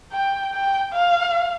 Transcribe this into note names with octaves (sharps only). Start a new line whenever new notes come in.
G5
G5
F5